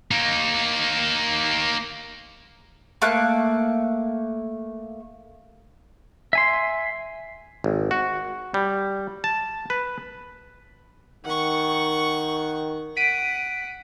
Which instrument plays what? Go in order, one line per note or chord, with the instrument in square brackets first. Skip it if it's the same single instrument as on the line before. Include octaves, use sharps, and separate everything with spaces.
[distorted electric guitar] A#3 D#4
[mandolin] A3 A#3 F#6
[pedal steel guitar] E5 G#5 C6
[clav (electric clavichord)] G#1
F#4
G3
A5
B4
[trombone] D#3 [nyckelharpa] F#5 C#6
[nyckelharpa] F#5 [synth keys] B6 D7 D#7